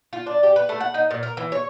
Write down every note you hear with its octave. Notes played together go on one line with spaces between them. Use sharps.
F4
D4
G4
B4
A3
F#5
D#4
A#2
A#4
E3
C#5